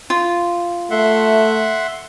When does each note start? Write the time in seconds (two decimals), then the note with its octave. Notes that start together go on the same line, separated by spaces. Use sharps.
0.10 F4
0.91 A3 E5 F#5 C6